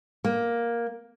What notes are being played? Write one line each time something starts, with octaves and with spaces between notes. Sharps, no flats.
A#3